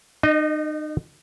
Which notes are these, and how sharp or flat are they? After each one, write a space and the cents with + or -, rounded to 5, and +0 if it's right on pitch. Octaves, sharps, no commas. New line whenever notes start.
D#4 -35 D#5 +0